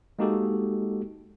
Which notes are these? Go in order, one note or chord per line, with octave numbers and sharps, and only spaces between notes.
G#3 A#3 D#4 F#4 G4 A4